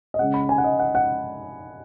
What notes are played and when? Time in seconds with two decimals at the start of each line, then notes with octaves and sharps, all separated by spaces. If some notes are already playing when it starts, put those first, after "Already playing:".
0.14 D#5
0.19 C#3 G#3 C#4 F#5
0.34 B5
0.49 G#5
0.58 F#5
0.64 D#5
0.79 F#5
0.95 F#5